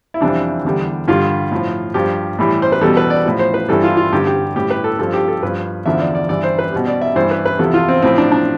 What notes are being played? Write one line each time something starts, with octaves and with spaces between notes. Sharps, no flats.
E4
F2 C3 E3 G3 D4
E2 D3 G3
G2 D3 G3 F4
A2 F3
G2 F3 G4
A2 E3 G3
C5
B4
E2 B2 G3 A4
B4
D5
A2 F3
C5
B4
G2 E3 G3 A4
F4
F4
G2 D3 G3 G4
G4
A2 G3 G4
B4
A4
G2 F3 A4
G4
A4
G2 F3 B4
E2 D3 F3 E5
D5
D5
G2 E3 G3 D5
C5
B4
B2 G3
D5
E5
G2 E3 G3 C5
B4
B4
E2 C3 F3 A4
F4
C4
A2 F3 C4
D4
D4